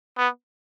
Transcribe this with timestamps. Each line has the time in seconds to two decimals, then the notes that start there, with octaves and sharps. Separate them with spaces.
0.17 B3